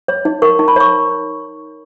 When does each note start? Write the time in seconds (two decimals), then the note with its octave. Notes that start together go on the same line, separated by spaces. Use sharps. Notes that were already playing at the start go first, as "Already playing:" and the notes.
0.08 C#5
0.25 D#4
0.42 A#4 C#6
0.59 D#4
0.68 B5
0.76 C#5 C#6